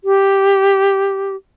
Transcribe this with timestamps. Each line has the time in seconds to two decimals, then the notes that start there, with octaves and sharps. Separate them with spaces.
0.04 G4